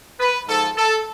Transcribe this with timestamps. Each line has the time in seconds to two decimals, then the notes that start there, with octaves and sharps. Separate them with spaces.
0.20 B4
0.47 G#2 F3 A4
0.77 A4